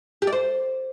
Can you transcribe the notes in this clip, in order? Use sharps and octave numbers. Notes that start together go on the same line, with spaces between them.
G4
D5
C5